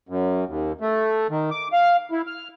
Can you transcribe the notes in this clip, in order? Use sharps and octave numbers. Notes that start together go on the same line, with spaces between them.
F#2
D#2
A3
D#3
D6
F5
E4
F6